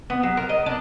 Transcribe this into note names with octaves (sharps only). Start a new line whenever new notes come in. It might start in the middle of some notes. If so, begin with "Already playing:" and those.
B3
F#3
A#4
D#5
D4